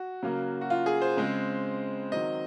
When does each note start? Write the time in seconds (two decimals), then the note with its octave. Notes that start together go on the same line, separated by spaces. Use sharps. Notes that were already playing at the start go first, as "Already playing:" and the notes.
Already playing: F#4
0.23 C#3 F#3 A#3
0.61 F#4
0.70 F4
0.86 G#4
1.02 C5
1.17 C#3 G#3 C4
2.12 D#3 F#3 C4 D#5